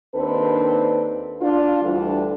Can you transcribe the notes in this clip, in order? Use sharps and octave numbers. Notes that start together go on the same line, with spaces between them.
D#2 C4 D4 A4 B4
D4 F4
D2 D3 E3 G3 D4 A4